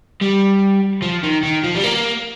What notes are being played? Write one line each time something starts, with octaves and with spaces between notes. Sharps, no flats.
G3
F3
D#3
D#3
F3
G3
A#3